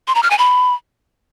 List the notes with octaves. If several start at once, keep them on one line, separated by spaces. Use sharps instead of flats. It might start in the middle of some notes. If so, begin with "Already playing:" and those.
C6
A#5
F6
G#5
B5